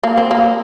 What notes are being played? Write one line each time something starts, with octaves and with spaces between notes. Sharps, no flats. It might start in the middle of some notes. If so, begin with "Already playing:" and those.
A#3
C4
A#3